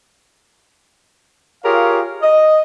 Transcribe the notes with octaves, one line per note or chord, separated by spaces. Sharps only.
F4 G4 G#4 A#4 C#5 F5
D#5